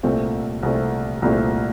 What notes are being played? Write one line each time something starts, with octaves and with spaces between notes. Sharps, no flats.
C2 A#2 A3 C4
C2 A#2 A3 C4
C2 A#2 A3 C4